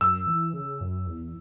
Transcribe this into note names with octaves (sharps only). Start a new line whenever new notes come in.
F#2 E6
E3
C#3
F#2
E2